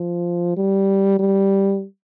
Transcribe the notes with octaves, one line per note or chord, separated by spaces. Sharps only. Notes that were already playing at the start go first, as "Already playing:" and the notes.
Already playing: F3
G3
G3